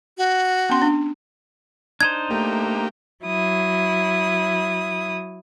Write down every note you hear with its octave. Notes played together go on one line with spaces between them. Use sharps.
F#4
B3 C#4 C6
D4
D4 D#4 C5 G#6
A3 A#3 G4
F#3 E4 D#6